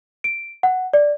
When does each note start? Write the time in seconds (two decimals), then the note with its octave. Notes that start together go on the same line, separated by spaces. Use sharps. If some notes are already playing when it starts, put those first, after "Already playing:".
0.24 D7
0.63 F#5
0.94 D5